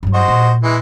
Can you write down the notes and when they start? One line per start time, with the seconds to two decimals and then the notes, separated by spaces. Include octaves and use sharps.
0.03 G2 F#3
0.14 F#4 C5 D#5
0.28 A#2
0.64 E3 G#3